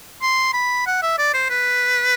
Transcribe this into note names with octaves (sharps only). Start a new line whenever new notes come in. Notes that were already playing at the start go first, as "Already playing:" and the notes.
C6
B5
F#5
E5
D5
C5
B4